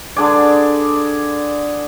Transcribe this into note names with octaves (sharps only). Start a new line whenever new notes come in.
D3 D4 G#4 D5